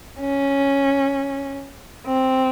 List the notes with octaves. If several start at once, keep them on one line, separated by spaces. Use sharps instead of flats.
C#4
C4